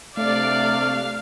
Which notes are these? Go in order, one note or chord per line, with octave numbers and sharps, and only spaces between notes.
C3 A3 D4 D5 F5